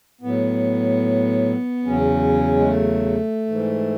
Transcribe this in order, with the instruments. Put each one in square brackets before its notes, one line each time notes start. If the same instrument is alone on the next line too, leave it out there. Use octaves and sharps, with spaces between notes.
[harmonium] A2 F#3 B3
E2 C#3 F#3 C#4
G#3
A3
G#2 E3